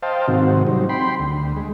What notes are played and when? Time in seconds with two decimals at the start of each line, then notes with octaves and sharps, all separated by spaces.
0.03 C5 D#5 F5 G5 A5
0.28 G#2 C3 D#3 C4 F#4
0.67 F#3 G3 C4 D#4
0.89 G5 B5 C6
1.19 D2
1.56 G#3